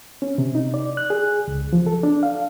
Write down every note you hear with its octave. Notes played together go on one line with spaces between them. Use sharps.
C#4
C3
D#4
D5
F#6
G#4
C#2
F3
A4
D4
F5